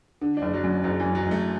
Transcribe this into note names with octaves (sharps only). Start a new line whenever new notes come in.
D3
D4
F#1
F#3
F#2
F#1 F#3
F#2 E3
F#3
F#1
A3